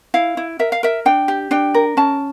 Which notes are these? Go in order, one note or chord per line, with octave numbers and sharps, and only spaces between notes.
E4 F5
E4
A#4 E5
F5
A#4 E5
D4 G5
G4
D4 G5
A#4
C#4 A5